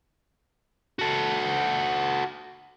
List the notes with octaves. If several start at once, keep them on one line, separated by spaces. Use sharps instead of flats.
F#4 A4